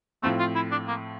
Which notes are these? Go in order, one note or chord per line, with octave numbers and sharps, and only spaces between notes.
A2 F3 A3 C4
F4
E4
D4
A#3